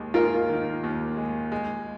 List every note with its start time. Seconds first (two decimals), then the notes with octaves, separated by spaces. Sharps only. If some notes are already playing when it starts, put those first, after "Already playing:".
Already playing: D#2 D#3 G#3
0.14 G#3 F4 A#4
0.49 D#3
0.84 D#2
1.17 G#3
1.52 G#3